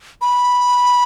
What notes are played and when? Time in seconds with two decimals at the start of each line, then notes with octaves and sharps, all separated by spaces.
0.21 B5